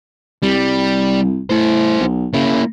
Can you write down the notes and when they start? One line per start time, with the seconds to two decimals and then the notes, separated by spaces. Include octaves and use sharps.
0.43 C2 G3
1.50 A2 E4 C5
2.01 B1
2.33 C#3 A#3 E4